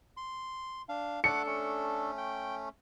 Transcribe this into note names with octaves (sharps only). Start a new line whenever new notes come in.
C6
D4 F5
A3 D4 A4 F#5 D6 C#7
A3 C#4
G5